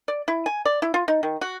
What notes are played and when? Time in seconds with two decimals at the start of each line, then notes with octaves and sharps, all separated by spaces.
0.08 D5
0.28 E4
0.46 G#5
0.65 D5
0.82 E4
0.94 F4
1.08 D#4
1.23 D#3
1.41 F#4